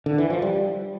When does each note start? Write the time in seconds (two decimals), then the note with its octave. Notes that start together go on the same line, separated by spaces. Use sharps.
0.06 D3
0.18 E3
0.30 F3
0.42 G3